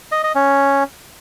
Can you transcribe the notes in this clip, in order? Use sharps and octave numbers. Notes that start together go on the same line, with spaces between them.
D#5
D#5
C#4